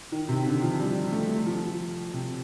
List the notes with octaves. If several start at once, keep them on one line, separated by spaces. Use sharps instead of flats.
D#3
C3
D3
F3
G3
A3
F3
C3